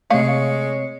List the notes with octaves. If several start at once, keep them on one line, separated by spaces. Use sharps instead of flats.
C3 G#3 A3 C#5 F5 C#7